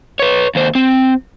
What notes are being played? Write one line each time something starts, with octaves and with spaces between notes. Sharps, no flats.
B4 C#5
D#2 C5
C4